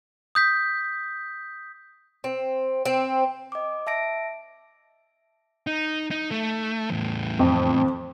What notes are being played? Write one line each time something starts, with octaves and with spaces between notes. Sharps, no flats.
D#6 G6 B6
C4
C4
D#5 D6
E5 A5 A#6 D7
D#4
D#4
A3
E2 A2
F2